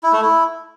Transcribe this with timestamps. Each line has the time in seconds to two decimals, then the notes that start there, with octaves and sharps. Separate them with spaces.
0.03 E4
0.13 A3
0.22 E4